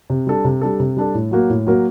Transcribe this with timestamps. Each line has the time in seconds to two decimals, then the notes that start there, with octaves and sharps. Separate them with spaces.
0.10 C3
0.27 G3 D4 A4
0.45 C3
0.62 G3 D4 A4
0.80 C3
0.97 G3 D4 A4
1.14 A2
1.31 F#3 A#3 F#4 A#4
1.50 A2
1.67 F#3 A#3 F#4 A#4